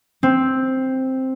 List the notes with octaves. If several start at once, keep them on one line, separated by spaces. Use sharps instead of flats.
C4